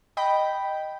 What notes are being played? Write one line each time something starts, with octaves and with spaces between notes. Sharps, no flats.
D#5 G5 B5